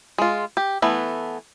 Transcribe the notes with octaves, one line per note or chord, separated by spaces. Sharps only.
G#3 F4
G4
E3 A3 B3